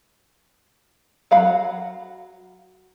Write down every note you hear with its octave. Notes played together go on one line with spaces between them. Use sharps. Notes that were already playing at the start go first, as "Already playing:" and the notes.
F#3 F5 F#5 B5